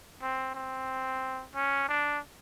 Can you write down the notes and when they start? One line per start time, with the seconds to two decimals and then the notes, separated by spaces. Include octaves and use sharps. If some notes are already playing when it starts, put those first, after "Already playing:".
0.22 C4
0.55 C4
1.55 C#4
1.89 D4